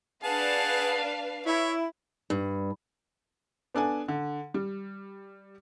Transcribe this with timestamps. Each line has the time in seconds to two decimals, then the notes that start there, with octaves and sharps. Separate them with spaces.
0.24 D4 G#4 B4 F5 F#5 A5
1.46 E4 C#5 E5
2.30 G2
3.74 B3 D4 A4 G#5
4.08 D3
4.54 G3